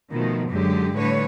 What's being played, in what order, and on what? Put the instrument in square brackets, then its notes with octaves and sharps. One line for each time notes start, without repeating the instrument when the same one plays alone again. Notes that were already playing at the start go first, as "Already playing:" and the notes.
[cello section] B2 D#3 F3 A3
F#2 D3 F#3 G#3 G4
A2 D3 G3 B4 C#5